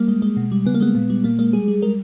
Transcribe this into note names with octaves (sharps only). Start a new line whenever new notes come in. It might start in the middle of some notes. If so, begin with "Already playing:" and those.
Already playing: G3 A#3
G#3
G#3
B2
G3
C#3 B3
A#3
G#3 B3
A#2
G3
A#2 A#3
G#3 A#3
G3 G#4
G3
G#3 A#4